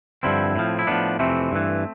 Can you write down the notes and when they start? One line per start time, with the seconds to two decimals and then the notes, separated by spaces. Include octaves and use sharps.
0.23 G2 D3 F3 C4 E4
0.56 A2 F3
0.79 E4
0.87 A2 F3 B3 D4
1.19 F2 C3 E3 A3 C4
1.52 G2 E3